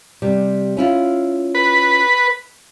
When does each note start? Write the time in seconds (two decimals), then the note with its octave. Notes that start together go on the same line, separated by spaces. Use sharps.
0.22 C3 G3
0.77 C#4 E4 F4
1.55 B4